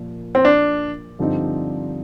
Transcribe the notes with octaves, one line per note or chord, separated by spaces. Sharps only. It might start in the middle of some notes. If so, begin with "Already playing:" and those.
Already playing: A#2 F3 A#3
C4
D4
G2 D3 F3 C4 D#4